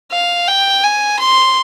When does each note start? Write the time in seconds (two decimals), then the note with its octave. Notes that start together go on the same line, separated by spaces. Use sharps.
0.12 F5
0.48 G5
0.83 G#5
1.19 C6